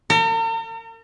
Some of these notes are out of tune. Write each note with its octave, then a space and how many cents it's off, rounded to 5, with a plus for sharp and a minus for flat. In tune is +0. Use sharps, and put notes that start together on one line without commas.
A#4 -45